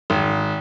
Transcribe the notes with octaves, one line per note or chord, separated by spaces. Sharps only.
G#1